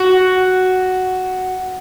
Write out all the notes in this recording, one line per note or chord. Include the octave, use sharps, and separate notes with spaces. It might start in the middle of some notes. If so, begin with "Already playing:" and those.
Already playing: F#4